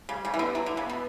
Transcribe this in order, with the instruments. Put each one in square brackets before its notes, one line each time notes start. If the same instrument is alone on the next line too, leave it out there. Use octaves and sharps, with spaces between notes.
[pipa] C#3 [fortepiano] G3
[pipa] C#3 [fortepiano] G3
[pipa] E3
[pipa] D3 [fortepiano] B3
[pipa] F#3 [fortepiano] E4
[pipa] D3
[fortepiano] E4
[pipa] C#3
[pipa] B2 [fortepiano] B3